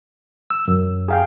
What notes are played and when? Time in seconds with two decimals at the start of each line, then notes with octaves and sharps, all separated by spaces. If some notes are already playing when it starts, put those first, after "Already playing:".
0.50 E6
0.68 F#2
1.08 G#4 F5 G5